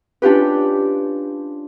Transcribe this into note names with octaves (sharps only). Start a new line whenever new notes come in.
C#4 D4 F4 G4 B4